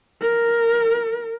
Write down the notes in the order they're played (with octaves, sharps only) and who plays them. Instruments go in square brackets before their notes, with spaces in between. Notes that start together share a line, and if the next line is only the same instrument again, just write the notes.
[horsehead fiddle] A#4